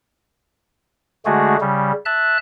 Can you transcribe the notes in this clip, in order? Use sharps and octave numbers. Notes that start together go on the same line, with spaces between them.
D3 G#3 A3 F#4 G#4
C#3 G3
E5 A5 F#6